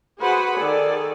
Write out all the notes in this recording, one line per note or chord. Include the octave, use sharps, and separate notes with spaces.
F#4 G#4 B4 C5 F#5 B5
D#3 G#4 A4 D5